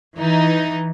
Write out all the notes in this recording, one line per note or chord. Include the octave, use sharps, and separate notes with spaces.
E3 D#4